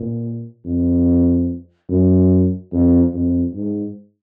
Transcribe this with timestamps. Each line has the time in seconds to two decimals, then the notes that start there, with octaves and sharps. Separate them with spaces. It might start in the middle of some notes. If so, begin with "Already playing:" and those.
Already playing: A#2
0.66 F2
1.89 F#2
2.73 F2
3.13 F2
3.55 G#2